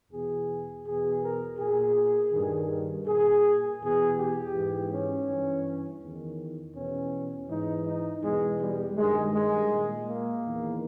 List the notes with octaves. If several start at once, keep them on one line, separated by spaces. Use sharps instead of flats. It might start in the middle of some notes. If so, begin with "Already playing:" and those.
E2 B2 G#4
E2 B2 G#4
A#4
A#2 G#4
G2 D#3
A#2 G#4
E2 B2 G#4
G4
G#2 E3
C#4
G2 E3
E2 D#3
E2 B2 C#4
G#2 E3 D#4
D#4
E2 B2 G#3
G3
G2 D#3 G#3
G#3
A#2
A#3
E2 D#3